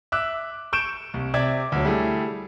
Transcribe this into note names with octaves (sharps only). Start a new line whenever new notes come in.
E5 D6 E6 F#6
C#6 G6 D7 E7
C2
C3 D5 E5 D6 G#6
D2 F#3
G3 A3 E4 G#4